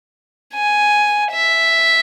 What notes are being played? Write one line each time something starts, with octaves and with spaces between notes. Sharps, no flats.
G#5
E5